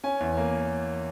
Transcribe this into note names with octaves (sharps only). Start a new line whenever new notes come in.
C#4 G#5
E2
A#3